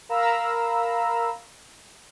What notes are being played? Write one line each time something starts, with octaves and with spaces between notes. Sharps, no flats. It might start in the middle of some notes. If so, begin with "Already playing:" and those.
A#4 F5 A#5 B5 E6